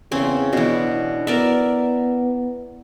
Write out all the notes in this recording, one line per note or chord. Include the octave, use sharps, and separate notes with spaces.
E2 C#3 C4 C#4
B2 E3 D4
B3 A#4 D5 E5